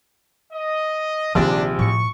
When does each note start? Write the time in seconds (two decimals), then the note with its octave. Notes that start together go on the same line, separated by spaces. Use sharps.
0.53 D#5
1.35 A#1 C3 D#3 D4 D#4
1.79 A2 F3 C#6